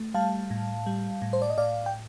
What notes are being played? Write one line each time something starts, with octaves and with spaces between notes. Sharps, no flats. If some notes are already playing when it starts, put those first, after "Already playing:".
Already playing: A3
G3 F5 A5
A2
G3
A2
C5
D5
D#5
A2 D5 F5
G5